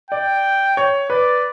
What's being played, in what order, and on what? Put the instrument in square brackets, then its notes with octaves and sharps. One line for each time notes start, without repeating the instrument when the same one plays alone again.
[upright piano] D5 [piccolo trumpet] G5
[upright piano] C#5
[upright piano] B4 [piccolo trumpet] D5